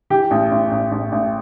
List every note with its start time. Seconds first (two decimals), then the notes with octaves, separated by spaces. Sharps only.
0.10 E3 G4
0.31 A1
0.51 A1
0.71 A1
0.92 A1
1.12 A1